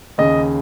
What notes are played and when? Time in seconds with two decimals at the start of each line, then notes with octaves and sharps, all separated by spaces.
0.18 D#2 C#3 D#5